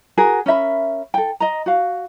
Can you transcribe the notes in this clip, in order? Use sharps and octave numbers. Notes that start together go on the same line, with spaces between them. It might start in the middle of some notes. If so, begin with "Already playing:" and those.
F#4 G#4 A#4
C#4 A#4 E5 B5
A4 G5
D#5 A#5
F#4 F5